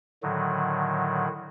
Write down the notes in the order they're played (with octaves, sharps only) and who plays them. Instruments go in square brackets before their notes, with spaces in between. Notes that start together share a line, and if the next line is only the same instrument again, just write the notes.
[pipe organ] A2 D3 D#3 F#3